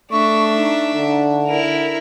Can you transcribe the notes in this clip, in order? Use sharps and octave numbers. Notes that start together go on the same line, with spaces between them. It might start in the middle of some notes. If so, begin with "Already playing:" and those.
A3 D4 E5 C#6
D#4
D3
E4 A#4